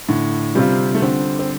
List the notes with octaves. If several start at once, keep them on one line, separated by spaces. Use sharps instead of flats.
A2 D3
C3 G3 C4 F4
A3
D3 C4
C4